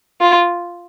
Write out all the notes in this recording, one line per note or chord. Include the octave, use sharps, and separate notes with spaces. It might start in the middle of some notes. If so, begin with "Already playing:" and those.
F4